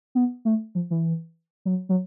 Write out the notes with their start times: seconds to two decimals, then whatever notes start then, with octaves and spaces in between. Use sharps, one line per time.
0.15 B3
0.45 A3
0.75 F3
0.90 E3
1.65 F#3
1.89 F#3